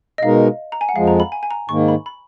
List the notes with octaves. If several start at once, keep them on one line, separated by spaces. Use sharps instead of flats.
D#5
B2 G#3 D#4 A#4 F5
A#5
G#5
F#5
F2 F3 G#3 F5
A#5
B5
G#5
G#5
A#5
G#2 D#3 A#3 C#6
B5
B5